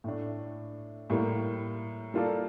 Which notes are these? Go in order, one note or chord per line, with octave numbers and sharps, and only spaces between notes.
A2 A3 D4
A2 G3 A#3
G3 A#3 F4 A4 D5